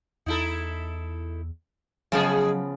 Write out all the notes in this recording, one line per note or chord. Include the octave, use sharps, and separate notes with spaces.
E2 D#4 E4 A4
C#3 F3 F#3 G#3 B3 G#4